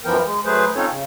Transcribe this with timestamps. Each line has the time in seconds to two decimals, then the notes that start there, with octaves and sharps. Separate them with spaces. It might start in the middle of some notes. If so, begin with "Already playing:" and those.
0.05 F#2 E3 F3 B3 A#4 G5
0.25 G#3
0.45 F#3 A3 G#4 B4 C5
0.75 C4 C#4 D#4 F4 A4 C#5
0.89 C#3